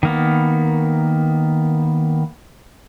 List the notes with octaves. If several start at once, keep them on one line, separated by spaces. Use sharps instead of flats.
D#3 A#3 B3